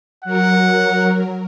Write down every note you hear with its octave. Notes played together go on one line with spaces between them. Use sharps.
F#3 A#4 F#5